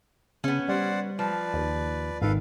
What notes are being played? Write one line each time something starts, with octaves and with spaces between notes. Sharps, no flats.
C#3 B3 C#4
G3 C5 D5 F#5
F3 B4 D5
D#2
G#1 D#3 A4 B4 F5